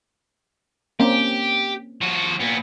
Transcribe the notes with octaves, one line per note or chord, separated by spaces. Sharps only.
A#3 C4 C#4 G4
F3 F#4
A#2 B3